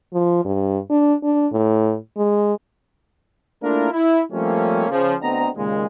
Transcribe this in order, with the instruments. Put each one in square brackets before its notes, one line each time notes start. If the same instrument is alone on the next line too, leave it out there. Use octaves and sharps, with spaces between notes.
[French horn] F3
G2
D4
D4
A2
G#3
[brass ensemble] A3 A#3 D4 E4 F4 A#4
E4
F3 G3 A3 A#3 C4 C#4
C#3 F3
D2 D3 B3 C4 D#5 A#5
D#2 A#2 C#3 G#3